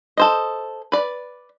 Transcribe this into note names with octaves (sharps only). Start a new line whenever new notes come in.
A4 C5 D#5
B4 D5